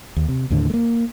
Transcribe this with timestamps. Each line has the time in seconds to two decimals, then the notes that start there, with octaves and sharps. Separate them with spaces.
0.17 D#2
0.28 C3
0.50 D#2 A2 D3
0.70 A3 A#3